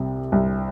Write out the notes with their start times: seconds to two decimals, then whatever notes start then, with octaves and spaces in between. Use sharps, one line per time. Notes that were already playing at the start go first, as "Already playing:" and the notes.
Already playing: C2 C3
0.32 C2 C3